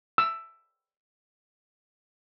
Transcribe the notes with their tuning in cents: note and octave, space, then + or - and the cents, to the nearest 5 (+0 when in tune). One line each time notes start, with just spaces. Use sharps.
E6 +10